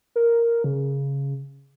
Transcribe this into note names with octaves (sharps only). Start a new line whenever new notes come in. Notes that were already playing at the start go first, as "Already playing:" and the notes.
A#4
C#3